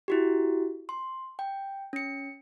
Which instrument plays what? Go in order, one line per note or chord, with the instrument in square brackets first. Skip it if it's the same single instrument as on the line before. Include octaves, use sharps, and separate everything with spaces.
[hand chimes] E4 F#4 G4
C6
G5
C#4 C#7